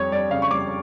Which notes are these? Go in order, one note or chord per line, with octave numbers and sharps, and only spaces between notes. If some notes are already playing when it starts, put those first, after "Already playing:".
Already playing: F2 G3 C#5
G3 D5
C#3 F5
C#6
G3 D6